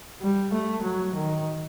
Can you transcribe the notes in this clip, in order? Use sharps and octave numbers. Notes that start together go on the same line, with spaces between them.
G3
A3
F#3
D#3